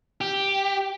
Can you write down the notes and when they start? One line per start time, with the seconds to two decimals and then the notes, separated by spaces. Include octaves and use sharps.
0.21 G4